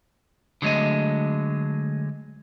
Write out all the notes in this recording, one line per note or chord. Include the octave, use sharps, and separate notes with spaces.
D3 F#3 G#3 A3 D#5